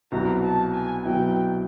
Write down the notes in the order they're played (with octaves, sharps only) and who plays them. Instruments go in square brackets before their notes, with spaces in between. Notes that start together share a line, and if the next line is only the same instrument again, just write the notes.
[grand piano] C2 B2 F#3 B3 E4 [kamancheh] A#5
[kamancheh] A5
G#5
[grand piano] C2 B2 F#3 B3 E4 [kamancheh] G5